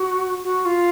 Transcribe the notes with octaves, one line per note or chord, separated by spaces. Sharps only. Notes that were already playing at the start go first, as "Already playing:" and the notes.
Already playing: F#4
F#4
F4